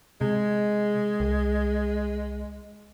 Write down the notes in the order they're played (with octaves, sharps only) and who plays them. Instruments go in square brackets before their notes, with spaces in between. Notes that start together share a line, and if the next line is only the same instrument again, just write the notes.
[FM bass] C3 [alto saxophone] G#3
[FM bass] C2